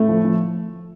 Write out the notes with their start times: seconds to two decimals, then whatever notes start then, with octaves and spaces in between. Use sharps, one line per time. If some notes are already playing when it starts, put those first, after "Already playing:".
Already playing: A2 A3
0.09 F3
0.25 F3